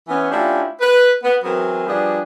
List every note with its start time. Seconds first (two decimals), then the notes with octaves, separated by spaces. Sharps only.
0.08 E3 B3 C#4
0.31 A3 C#4 D4 E4 F4 G4
0.81 B4
1.23 B3
1.43 E3 F#3 B3 C4 G#4 A#4
1.87 F3 G3 B3 D4 F4 G#4